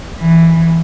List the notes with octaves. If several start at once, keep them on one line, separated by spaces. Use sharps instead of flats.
E3